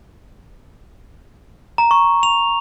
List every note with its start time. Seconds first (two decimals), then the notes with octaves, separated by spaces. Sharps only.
1.78 A#5
1.91 C#6
2.23 F7